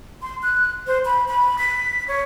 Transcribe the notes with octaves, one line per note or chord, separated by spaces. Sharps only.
C6
F#6
C5
B5
B5
B6
C#5